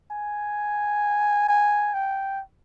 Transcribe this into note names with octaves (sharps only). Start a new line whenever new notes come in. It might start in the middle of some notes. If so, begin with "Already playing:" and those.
G#5
G#5
G5